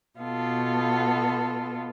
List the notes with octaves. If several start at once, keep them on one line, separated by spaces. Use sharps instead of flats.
B2 B3 F4 A4